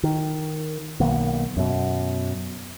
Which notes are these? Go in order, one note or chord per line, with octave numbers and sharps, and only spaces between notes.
D#3
B1 D#3 A#3 B3
F#2 B2